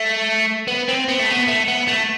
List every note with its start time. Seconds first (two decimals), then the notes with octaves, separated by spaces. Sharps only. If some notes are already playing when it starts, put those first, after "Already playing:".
Already playing: A3
0.68 B3
0.88 C4
1.08 B3
1.19 A3
1.31 B3
1.48 A3
1.68 B3
1.88 A3